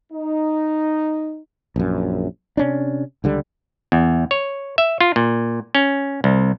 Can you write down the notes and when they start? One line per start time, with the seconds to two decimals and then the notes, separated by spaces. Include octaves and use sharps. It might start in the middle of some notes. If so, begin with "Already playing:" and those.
0.12 D#4
1.76 A#1 F#2
2.57 C3 C#4 D4
3.24 C#2 D3 G3
3.92 E2
4.31 C#5
4.78 E5
5.01 F4
5.16 A#2
5.75 C#4
6.24 C2